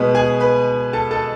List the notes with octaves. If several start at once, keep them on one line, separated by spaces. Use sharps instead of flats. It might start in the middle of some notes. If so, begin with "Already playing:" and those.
Already playing: B2 G#3 B4 B5
G#4 G#5
B4 B5
A4 A5
A4 A5